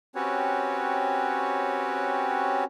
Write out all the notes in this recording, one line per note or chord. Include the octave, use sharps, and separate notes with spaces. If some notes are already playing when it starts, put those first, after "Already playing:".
C4 C#4 F#4 G4 B4 C#5